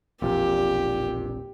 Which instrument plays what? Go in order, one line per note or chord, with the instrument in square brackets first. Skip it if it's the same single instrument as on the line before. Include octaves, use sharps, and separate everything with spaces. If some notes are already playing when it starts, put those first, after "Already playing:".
[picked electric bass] E1 A#1 F2 [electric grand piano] A#2 [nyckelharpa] G4